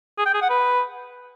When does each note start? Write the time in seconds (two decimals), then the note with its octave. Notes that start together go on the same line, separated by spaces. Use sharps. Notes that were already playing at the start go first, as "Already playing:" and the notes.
0.18 G#4
0.26 G5
0.34 G#4
0.42 F#5
0.50 B4